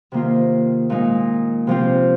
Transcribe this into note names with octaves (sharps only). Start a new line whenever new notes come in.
C3 D#3 A#3 F4
A#2 G#3 D#4
C3 F3 C4 F4